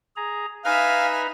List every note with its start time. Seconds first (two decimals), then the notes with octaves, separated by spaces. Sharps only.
0.16 G#4 A#5
0.65 D#4 B4 E5 F5 G#5 A#5